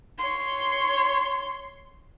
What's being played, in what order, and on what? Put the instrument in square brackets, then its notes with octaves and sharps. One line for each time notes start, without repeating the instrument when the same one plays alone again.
[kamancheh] C#5 C6